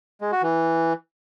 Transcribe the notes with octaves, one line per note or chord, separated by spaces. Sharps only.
G#3
F#4
E3